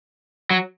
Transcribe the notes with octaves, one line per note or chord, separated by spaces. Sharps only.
F#3